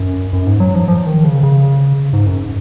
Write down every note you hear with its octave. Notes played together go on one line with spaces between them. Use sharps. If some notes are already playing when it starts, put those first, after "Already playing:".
Already playing: F#2
F#2
G#2
F#3
F3
F3
D#3
C#3
C#3
G#2
F#2